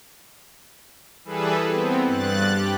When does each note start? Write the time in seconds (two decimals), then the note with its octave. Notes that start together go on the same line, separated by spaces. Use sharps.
1.24 E3 G3 G#4 A4 B4
1.68 B3 C4
2.06 G2 F#6 A6
2.46 G4